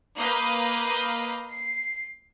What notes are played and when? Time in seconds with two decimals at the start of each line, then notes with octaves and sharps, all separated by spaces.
0.17 A#3 B4 D#5 F5 A#5 G6
1.50 C7